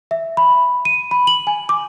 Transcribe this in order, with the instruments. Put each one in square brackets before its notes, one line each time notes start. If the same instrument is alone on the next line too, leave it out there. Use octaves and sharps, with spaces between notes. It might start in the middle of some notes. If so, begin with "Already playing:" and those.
[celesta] E5
B5
D#7
B5
F#7
G#5
D6